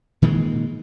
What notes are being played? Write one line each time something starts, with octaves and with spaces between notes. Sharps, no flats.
A#2 D#3 E3 G#3